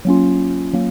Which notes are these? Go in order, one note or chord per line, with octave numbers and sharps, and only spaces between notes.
F#3 A#3 C#4 F4
F#3 A#3